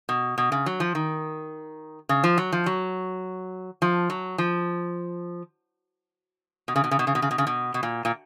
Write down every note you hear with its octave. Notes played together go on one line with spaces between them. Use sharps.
B2
B2
C#3
F#3
F3
D#3
C#3
F3
F#3
F3
F#3
F3
F#3
F3
B2
C#3
B2
C#3
B2
C#3
B2
C#3
B2
C#3
B2
B2
A#2
A#2